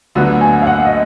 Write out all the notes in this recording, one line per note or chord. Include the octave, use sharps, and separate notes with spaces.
D2 D3 F#3 B3
G#5
F5
F#5
D#5